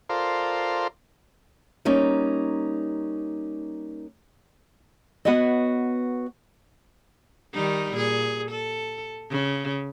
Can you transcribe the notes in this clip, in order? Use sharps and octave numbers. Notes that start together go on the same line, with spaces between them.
F4 A4 A#4 C5 D5 F5
G3 A#3 C#4 D#4
B3 F#4 B4 C#5 D#5
D#3 G3 D#4
A#2 G#4
A4
C#3